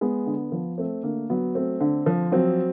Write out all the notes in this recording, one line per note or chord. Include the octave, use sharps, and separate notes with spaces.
G#3 B3
D3
F3
A3 C4
D3 A#3
F#3 B3
A3 C4
D3
F3
F#3 C4